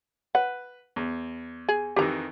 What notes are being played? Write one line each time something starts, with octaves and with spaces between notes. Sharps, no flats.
B4 F#5
E2
G#4
F2 D#3 E3 G4 A#5